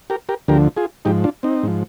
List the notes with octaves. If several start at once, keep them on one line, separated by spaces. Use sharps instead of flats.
G4 A#4
G4 A#4
D2 D3 F3 G4 A#4
F4 G#4
G#2 F3 D#4 G4
D4 F4
C4 D#4
G#2 F3